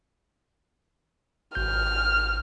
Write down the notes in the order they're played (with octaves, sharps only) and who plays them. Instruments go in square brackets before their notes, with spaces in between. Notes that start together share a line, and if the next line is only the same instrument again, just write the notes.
[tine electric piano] G#1 G6 [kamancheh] F6